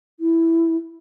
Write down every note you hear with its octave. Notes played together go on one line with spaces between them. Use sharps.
E4